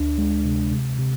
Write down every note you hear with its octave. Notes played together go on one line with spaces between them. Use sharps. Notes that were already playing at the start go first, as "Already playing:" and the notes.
Already playing: D2 D4
G#3
C3
C3
C3